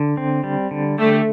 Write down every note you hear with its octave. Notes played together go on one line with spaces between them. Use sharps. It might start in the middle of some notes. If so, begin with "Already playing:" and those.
Already playing: D3
C4
G3
D3
A3 G4